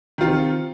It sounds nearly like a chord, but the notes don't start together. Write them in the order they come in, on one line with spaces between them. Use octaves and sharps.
D#3 F4 C3